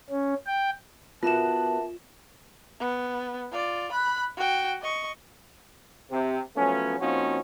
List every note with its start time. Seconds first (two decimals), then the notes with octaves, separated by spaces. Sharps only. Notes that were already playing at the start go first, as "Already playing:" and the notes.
0.10 C#4
0.47 G5
1.23 B3 F4 F#4 A#4 E5 A5 E7
2.79 B3
3.51 F4 D5
3.92 B5 F#6
4.37 F#4 G5
4.82 D#5 C#6
6.11 C3
6.56 F3 F#3 A3 B3 C#4
7.00 F3 A#3 C4 C#4 D#4 F#4